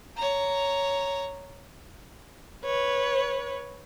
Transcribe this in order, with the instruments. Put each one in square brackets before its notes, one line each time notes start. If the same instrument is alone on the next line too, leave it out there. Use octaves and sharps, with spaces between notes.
[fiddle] C#5 A#5
[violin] B4 C#5